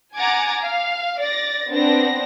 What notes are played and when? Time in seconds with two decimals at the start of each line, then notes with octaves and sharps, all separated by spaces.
0.17 F#5 G#5 A#5 D6 G#6 A6
0.60 F5
1.19 D5 A6 A#6
1.69 B3 C4 D4 A#6